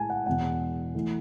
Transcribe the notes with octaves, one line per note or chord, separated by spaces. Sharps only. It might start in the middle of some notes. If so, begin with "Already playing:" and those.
Already playing: A2 G#3 G#5 A5
F#5
E2 B2 G#3 F#5
E3 A3